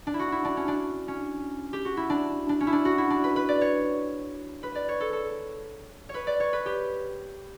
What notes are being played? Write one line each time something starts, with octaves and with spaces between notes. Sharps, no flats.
D4
E4
F#4
E4
D4
C#4
D4
C#4
G4
F#4
E4
D4
D4
C#4
E4
D4
F#4
E4
D4
B4
B4
D5
C#5
B4
D5
C#5
A4
A4
C#5
B4
D5
C#5
B4
G4